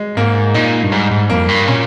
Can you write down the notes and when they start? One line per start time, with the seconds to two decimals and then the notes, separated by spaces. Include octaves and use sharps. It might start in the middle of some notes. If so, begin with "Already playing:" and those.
Already playing: G#3
0.17 G#2 A#3
0.54 A#2 D#4
0.83 G2
0.92 G#2 G3
1.11 G#2
1.30 F2 A#3
1.48 G2
1.67 A#2 C#4